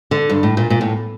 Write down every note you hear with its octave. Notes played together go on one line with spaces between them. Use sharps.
D3
G2
A2
A#2
A#2
A2